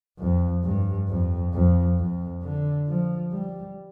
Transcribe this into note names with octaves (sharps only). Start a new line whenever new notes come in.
F2
G2
F2
F2
F2
D3
F3
G3